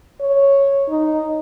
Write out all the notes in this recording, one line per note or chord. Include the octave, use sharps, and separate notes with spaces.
C#5
D#4